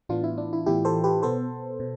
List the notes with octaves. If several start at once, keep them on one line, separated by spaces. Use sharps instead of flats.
A2 E3 B3 D4 F4
E4
D4
E4
A2 E3 B3 E4 G4
A4 C5
G4 B4
B2 B3 A4 C5
B2